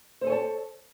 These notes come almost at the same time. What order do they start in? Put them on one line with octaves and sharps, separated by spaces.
C5 A4 G#5 C#5 A5